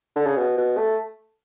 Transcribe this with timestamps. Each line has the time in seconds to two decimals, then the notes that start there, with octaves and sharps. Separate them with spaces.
0.16 D3
0.26 C#3
0.36 B2
0.58 B2
0.77 A3